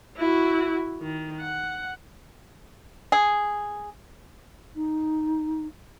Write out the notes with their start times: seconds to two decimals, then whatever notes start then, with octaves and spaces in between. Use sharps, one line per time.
0.17 E4 F#4
1.01 D#3
1.41 F#5
3.12 G#4
4.76 D#4